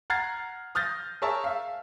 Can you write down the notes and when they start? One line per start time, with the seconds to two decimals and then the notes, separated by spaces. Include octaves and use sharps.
0.10 F#5 A#5 F6 G#6 A6 C7
0.75 D#6 F6 G6 A6 A#6
1.22 G#4 A#4 C#5 E5 A5
1.44 E5 F5